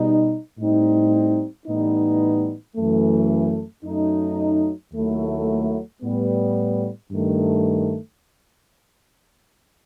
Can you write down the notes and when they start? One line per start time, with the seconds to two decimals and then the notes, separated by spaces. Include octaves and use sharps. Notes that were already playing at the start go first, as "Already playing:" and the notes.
Already playing: B2 G3 D#4
0.57 A2 G3 C4 D#4
1.66 A2 E3 G3 B3 D#4
2.76 F#2 E3 A3
3.83 F#2 F#3 A3 D#4
4.92 D#2 D#3 F#3 A3 E4
6.01 A2 G3 B3
7.09 G2 D#3 A3